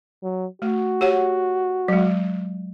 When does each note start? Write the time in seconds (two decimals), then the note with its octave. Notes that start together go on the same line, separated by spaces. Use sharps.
0.22 F#3
0.62 A3 F#4
1.01 G4 C#5 F#5
1.88 F#3 G#3